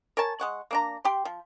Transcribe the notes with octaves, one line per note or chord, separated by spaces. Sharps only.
A#4 C#5 G#5 A5
G#3 F#5 C#6
A#3 D4 A#5
G4 G5 C6
F3